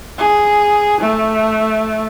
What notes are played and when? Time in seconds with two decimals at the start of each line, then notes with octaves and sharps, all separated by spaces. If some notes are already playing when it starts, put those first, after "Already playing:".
0.18 G#4
1.00 A3